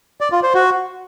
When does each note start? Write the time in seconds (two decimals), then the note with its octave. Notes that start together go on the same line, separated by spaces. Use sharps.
0.21 D5
0.32 F4
0.43 C5
0.54 F#4